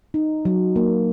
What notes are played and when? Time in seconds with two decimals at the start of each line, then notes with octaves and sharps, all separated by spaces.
0.14 D#4
0.45 F#3
0.76 A#3